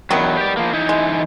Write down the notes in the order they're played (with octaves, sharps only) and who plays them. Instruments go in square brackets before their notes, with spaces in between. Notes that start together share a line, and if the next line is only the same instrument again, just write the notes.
[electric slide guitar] E2 F#3 [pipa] D#3 G3 B3
[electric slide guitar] G4 D5
F3 A#3
E3 D#4 E4
[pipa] G#3